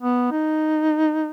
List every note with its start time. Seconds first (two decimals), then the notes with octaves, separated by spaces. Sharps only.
0.01 B3
0.32 D#4